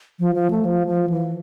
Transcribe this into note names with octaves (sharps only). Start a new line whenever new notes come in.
F3
F3
A3
F3
F3
E3